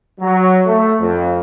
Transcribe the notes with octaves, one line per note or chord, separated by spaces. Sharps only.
F#3
A3
F2